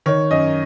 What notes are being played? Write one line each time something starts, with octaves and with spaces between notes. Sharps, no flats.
D#3 C#5
F#2 D#5